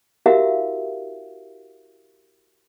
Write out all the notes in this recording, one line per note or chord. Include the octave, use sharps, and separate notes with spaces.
E4 F#4 G4 A#4 E5 F5